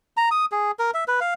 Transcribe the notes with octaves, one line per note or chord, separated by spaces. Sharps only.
A#5
D#6
G#4
A#4
E5
B4
F5